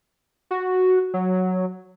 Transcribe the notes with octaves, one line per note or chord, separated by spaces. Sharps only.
F#4
F#3